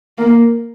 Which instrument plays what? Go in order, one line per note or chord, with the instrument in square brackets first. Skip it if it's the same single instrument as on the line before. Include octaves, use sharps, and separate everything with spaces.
[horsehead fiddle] A#3